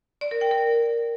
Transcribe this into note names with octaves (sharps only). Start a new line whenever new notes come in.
D5
A#4
G5
A#4